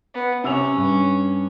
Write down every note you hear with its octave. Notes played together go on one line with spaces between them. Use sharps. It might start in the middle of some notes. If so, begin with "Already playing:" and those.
B3
C3 C#4 E6 F7
G2